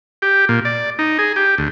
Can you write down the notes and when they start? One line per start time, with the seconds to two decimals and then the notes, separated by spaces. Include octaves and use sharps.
0.22 G4
0.49 A#2
0.65 D5
0.99 D#4
1.19 G#4
1.36 G4
1.58 D2